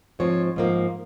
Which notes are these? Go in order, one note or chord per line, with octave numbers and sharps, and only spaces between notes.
G#2 F3 C4 C#5
G#2 F3 A#3